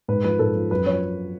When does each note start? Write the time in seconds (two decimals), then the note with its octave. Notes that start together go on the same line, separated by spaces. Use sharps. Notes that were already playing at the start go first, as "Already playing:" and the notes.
0.08 G#2 B4
0.24 F3 B4
0.39 G#2 A4
0.55 F3
0.70 F#2 B4
0.86 F3 C#5